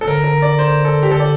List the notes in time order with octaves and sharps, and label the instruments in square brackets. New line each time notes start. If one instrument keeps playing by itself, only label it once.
[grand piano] A4
[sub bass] D3 [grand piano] A#4
[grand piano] A#4
D5
C5
A4
G4
[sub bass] D3 [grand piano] A4
[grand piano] D5